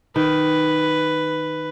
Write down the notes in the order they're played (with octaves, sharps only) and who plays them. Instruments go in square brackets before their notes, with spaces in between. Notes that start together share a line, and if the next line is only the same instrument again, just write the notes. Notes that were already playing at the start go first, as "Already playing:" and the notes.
[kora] D#3 [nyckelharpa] B4